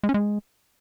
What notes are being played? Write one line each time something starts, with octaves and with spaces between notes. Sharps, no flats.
G#3
C#4
G#3